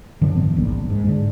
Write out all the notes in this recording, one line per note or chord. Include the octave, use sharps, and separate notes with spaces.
F#2 D3 E3 F#3
G#2 E3 B3 C4
D#1 A#1 A#2
G#2
G#2 D3